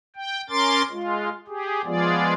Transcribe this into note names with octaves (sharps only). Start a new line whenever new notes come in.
G5
C#4 A#4 C6 D6 A6
G#3 F4
G4 G#4
F3 G#3 B3 F4 G#4 D5